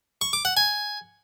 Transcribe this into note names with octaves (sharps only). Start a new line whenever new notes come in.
C#6
D6
F#5
G#5